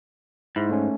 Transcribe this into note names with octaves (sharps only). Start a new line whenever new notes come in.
G#2 E4
A3 C#4